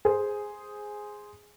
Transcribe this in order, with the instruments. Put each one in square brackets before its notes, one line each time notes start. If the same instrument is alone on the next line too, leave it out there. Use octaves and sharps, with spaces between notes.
[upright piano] G#4 C5